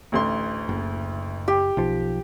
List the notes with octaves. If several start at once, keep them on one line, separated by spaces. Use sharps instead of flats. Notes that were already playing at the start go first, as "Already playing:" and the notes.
A1 D2 C6
F#1
G4
B1 F3